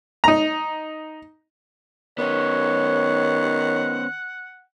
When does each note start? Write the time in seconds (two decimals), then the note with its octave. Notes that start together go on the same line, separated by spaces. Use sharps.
0.24 D#4 A#5
2.18 D#3 B3 C#4 C#5 F#5